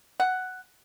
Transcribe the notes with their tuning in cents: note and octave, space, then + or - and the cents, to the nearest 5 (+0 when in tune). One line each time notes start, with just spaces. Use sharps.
F#5 +5